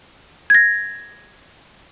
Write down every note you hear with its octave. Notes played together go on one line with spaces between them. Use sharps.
G#6 A#6